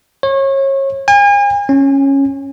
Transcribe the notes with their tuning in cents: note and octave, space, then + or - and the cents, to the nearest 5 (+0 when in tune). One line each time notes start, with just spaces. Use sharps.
C#5 -30
G#5 -40
C#4 -10